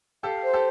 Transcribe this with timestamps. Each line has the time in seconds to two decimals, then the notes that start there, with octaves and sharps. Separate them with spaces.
0.23 G4 A4 F5
0.43 C5
0.53 G4 A4